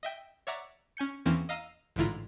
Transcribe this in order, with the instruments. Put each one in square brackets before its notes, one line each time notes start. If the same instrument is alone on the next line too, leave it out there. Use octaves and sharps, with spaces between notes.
[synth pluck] D#5 E5 G5
C#5 D5 E5 F#5 A#5 D6
C#4 G#5 G6 C#7
E2 E3 A#3 C4 C#4
D#5 F5 A#5 E6 D#7
A1 G#2 D3 E4 F4 A#5